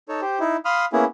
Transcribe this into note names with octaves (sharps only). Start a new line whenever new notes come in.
D#4 A4 C#5
G4 C5
D#4 E4
F5 B5 C6 D#6 F6
A#3 B3 C#4 E4 G#4